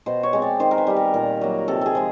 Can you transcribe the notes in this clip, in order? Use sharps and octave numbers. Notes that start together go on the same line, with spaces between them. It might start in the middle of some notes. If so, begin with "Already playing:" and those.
B2 C5
C#5
G#3 C4
D5
D#3 C5
A#4
B4
G3 B3
A#4
A#2 A#4
F#3 A#3
C3 A4
G#4 A4
F3 G#3